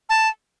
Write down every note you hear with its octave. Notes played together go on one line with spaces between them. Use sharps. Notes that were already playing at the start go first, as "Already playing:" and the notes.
A5